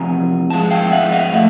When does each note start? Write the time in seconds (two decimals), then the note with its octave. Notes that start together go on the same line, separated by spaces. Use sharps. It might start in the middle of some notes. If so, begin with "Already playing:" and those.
Already playing: E2 C3 F3 G#5 A#5
0.50 G#2 F3 G#3 A5
0.71 F5 G5
0.92 E5 F#5
1.12 D#5 F5
1.32 A#2 F3 A3 E5 F#5